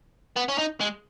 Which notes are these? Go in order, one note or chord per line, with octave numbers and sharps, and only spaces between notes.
B3
C#4
D#4
G#3